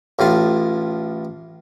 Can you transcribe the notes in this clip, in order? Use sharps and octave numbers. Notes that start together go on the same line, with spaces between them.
A1 A2 F4 A5